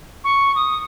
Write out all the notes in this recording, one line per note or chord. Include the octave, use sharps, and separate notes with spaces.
C#6
D#6